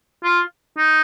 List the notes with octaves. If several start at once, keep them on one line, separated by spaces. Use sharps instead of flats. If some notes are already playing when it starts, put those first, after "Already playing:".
F4
D#4